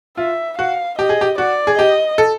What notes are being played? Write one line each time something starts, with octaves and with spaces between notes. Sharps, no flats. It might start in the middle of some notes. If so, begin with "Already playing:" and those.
F4 E5
F#4 F5
G4 D#5
G#4
G4
F#4 D5
G#4
G4 D#5
A4